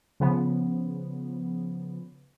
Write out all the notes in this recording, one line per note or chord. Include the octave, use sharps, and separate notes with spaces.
C#3 F3 B3